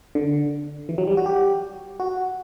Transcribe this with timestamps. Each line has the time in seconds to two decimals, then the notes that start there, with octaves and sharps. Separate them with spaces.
0.15 D3
0.89 E3
0.98 F#3
1.08 G3
1.17 F#4
1.26 G4
2.00 F#4